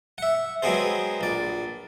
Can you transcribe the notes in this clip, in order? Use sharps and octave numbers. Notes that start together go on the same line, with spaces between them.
E5 F#5
F#3 G#3 B3 C4 G#4 C5
A#1 D5